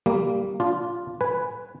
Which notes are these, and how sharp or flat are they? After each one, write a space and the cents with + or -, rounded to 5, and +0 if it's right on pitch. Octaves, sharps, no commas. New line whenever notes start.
G3 +0 A#3 -15
D4 -20 F4 +0
B4 +0 G#5 +0